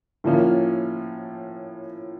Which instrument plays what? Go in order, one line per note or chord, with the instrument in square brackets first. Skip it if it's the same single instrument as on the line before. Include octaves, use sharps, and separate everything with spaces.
[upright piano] A2 F3 A#3 C#4 F4